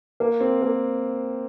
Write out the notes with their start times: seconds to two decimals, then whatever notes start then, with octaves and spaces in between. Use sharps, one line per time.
0.20 A#3
0.41 C4
0.62 A#3